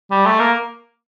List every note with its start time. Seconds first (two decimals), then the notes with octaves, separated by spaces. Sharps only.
0.10 G3
0.26 A3
0.40 A#3